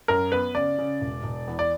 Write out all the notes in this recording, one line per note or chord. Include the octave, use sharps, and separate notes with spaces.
F#2 A#4
B3 B4
C#3 D5
C#3
E1
E1
E2
D5